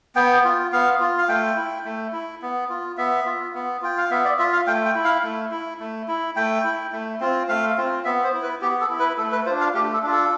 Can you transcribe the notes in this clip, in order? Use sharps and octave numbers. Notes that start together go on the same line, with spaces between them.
B3 G5
F4
B3 F5
F4
F5
A3 G5
E4
A3
E4
B3
F4
B3 E5
F4
B3
F4 G5
F5
B3 E5
D5
F4 E5
F5
A3 G5
G5
E4
F5
A3
E4
A3
E4
A3 G5
E4
A3
C4 F4
A3 F5
C4 F4
B3 E5
C5
E4
B4
B3 G4
A4
E4
B4
A3 A4
B4
D4 F4 C5
F5
A3 G4
A4
D4 F4
A4